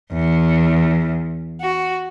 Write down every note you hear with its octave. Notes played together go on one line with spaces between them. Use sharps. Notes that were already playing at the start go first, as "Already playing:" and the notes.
E2
F#4